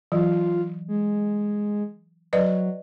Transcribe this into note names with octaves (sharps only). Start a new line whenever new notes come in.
E3 F#3 F4
G#3
F#3 B4 D5 D#5